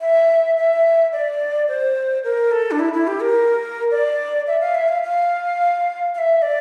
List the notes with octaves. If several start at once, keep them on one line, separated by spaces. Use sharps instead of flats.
E5
E5
D5
C5
A#4
A4
D4
E4
E4
G4
A#4
D5
E5
F5
E5
F5
F5
F5
E5
D5